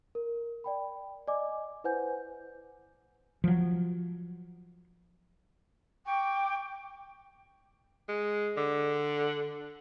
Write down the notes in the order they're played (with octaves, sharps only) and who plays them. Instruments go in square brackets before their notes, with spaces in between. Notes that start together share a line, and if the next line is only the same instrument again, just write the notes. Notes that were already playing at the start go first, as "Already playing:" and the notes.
[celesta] A#4
D5 G5 B5
D5 D#5 G#5 D6
E4 B4 C5 F#5 G#5 G6
[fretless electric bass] F3 F#3
[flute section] G5 C#6 D6
[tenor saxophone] G#3
D3